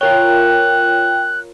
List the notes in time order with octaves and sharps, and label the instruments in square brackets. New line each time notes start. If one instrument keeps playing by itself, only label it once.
[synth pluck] F4 A#4 C#5 [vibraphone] G5 [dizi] F#6